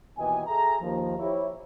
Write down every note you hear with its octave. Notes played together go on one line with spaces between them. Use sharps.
D#2 B2 E3 D#5 G5 G#5
G#4 A4 E5 G#5 A#5
D#2 F3
E4 G4 C5 C#5